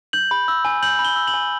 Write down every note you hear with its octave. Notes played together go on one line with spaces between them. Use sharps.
G6 F#7
B5
E6
G#5
G6 F#7
B5
G7
E6
F#7
G#5